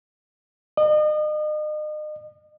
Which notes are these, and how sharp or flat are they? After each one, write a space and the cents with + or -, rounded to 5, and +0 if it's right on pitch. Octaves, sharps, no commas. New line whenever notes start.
D#5 -40